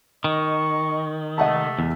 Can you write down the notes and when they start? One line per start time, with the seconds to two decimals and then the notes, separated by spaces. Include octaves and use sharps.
0.24 D#3 D#5 C#6
1.38 C3 G#3 A3 D#5 F#5 A5
1.79 E2